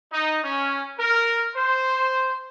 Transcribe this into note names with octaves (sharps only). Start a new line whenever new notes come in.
D#4
C#4
A#4
C5